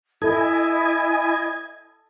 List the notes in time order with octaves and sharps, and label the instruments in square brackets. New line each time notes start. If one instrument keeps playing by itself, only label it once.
[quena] E4 [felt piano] A4 [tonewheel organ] D#5 G#5